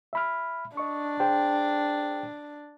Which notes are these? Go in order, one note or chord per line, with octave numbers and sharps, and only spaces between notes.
E5 B5 F6
D4 D#5 C#6
G#4 C5 G5